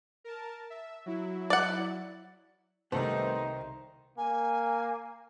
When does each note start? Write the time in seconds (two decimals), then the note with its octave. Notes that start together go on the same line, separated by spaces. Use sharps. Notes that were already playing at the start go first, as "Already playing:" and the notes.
0.24 A#4 A5
0.70 E5
1.06 F#3 E4
1.50 D5 F#5
2.92 C2 D#3 G3 A3 B3 D#4 C5
4.18 A#3 G#5